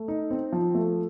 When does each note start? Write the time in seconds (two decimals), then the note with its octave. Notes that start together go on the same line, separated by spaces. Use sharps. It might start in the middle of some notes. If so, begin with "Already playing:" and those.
Already playing: A3
0.08 D#4
0.31 C4
0.53 F3
0.75 A3